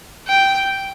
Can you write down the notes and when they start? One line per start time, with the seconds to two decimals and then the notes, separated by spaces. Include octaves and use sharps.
0.28 G5